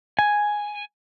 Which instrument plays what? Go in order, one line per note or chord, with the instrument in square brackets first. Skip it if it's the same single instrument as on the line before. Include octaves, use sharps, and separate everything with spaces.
[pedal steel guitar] G#5